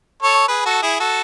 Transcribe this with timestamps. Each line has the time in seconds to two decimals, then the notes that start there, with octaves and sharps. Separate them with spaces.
0.23 A4 C#5
0.48 G#4 B4
0.66 F#4 A4
0.82 E4 G#4
1.00 F#4 A4